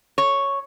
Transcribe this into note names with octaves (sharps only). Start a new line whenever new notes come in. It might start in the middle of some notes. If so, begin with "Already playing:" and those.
C#5